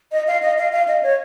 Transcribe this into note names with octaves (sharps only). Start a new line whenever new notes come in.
D#5
F5
D#5
F5
F5
D#5
C#5